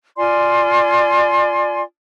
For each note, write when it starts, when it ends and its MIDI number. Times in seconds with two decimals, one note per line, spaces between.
0.16 1.81 65
0.16 1.81 74
0.16 1.81 80
0.16 1.81 84